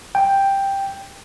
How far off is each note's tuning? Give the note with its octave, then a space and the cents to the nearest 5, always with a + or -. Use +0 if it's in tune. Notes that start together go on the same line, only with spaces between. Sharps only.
G5 +5